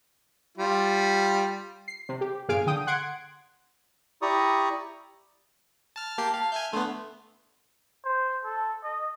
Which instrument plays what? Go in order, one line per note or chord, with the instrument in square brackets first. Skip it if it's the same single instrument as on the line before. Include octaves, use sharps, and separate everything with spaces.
[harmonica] G3 F4
[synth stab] C7
C3
G4
G1 A#2 G#4 F5 G#5 D7
D3 G5 D#6
F#5 C6 G#6 D7
[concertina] E4 G4 D5 A#5 C#6 D#6
[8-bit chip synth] A5 F6
[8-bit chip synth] A#3 G4 C7 [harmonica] A5
[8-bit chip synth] F5 [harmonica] A5
[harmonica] E5 [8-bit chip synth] G#5 F6 G6
[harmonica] D3 C6 [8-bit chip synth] A3 B3
[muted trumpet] C5
A4
D#5